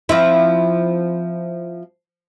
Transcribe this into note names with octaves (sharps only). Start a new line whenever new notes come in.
F3 C4 E4